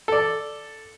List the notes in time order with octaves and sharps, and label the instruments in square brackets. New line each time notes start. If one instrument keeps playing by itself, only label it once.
[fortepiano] A4 D5